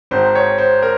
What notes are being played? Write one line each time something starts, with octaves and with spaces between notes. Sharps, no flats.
G#1 G#2 D#3 C5
C#5
C5
A#4